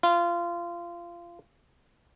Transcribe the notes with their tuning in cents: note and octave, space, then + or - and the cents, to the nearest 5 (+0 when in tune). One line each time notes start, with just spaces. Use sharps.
F4 -20